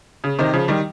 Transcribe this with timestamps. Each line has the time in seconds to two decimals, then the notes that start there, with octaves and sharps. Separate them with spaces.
0.24 C#3
0.39 C3 D#3
0.53 C#3 F3
0.68 D#3 G3